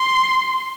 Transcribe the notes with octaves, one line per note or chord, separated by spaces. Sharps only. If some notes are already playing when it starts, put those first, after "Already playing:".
Already playing: C6